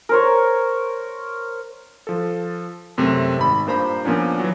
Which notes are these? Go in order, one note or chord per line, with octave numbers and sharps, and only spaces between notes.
A#4 C5 C#5
F3 A4
F#2 C3 A3 C4
G#1 B5
G2 A#2 C5 A#5 B5
A#2 F3 B3 C#4 D4
E3 F#3